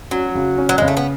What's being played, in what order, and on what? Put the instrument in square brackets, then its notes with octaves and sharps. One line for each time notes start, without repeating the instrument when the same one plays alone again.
[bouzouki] F#3 [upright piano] C#4
[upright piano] C#3
C#4
[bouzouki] F#3
[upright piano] C#3 [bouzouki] G#3
[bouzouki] A3
B3